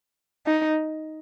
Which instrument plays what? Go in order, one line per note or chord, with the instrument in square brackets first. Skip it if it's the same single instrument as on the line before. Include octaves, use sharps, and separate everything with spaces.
[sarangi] D#4